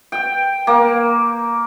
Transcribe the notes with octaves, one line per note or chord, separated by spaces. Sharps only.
G5
A#3